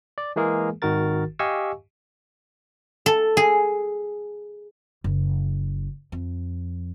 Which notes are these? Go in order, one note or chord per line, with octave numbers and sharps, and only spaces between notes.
D5
E3 G#3 A#3 G#4 A#4
G#1 D#3 F#4 A#4 A6
G4 D#5 F5 G#5 C#6 E6
A4
G#4
F#1
F2